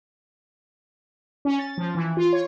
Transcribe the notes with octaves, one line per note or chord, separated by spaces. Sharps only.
C#4
A6
F3
E3
F4
C#5